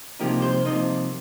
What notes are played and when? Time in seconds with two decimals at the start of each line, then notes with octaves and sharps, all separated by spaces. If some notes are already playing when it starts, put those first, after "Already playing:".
0.19 C2 C3 F3 A#3 D#4 G4
0.42 C5
0.64 C2 C3 F3 A#3 D#4 D#5